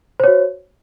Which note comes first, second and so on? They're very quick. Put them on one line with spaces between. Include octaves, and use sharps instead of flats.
C5 C#5 F#4